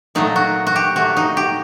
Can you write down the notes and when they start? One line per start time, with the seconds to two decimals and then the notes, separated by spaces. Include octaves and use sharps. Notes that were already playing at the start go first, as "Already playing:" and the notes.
0.15 A#2 F#3 A3 D#4
0.36 F#4
0.67 F#4
0.76 G4
0.96 A#2 F#3 A3 F#4
1.17 D#4
1.37 G4